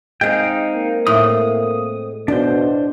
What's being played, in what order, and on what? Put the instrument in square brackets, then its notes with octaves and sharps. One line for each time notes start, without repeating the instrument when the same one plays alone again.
[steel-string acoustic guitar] G#3 C4 [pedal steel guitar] D#4 F5 G5
[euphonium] A#3
[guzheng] A2 [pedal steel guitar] D#6
[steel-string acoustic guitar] E2 [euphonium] B2 [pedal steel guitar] D4 C5